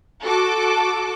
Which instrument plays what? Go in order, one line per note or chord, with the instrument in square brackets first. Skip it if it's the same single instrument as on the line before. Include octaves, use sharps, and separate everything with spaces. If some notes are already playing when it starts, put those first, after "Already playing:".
[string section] F#4 A4 D6